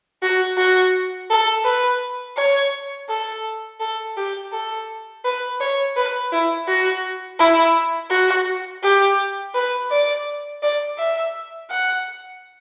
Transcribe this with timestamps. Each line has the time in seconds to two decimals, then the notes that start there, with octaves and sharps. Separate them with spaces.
0.22 F#4
0.57 F#4
1.30 A4
1.65 B4
2.37 C#5
3.09 A4
3.80 A4
4.17 G4
4.52 A4
5.24 B4
5.60 C#5
5.97 B4
6.32 E4
6.68 F#4
7.39 E4
8.11 F#4
8.83 G4
9.54 B4
9.91 D5
10.63 D5
10.98 E5
11.70 F#5